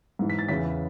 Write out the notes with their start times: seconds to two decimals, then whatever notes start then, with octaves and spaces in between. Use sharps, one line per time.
0.19 G#2 E3
0.30 B6
0.39 A6
0.48 E2 C#3 E3 B6